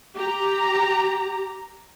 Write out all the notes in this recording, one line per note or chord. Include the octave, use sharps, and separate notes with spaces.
G4 A#5